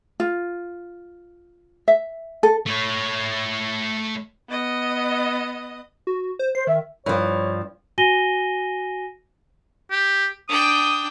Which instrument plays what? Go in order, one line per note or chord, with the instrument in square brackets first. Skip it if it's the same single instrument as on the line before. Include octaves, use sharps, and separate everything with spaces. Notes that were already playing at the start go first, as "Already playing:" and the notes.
[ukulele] F4
E5
A4
[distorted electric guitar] A3 C#5
[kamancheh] B3 D#5
[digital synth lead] F#4
C5
[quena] C5 [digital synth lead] C7
[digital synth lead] D#3 [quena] E5
[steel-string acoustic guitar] G2 F3 [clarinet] C#5
[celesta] F#4 G#5 A#6 D#7 G7
[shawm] G4
[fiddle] D4 G5 [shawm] D#6